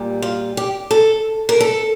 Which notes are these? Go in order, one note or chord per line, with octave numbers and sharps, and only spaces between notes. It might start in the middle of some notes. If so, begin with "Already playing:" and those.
Already playing: A#2 G3
F4
G4
A4
A#4
A4